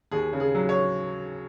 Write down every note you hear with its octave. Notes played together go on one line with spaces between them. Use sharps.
D#2 G#4
C#3
G#4
F#3
C#5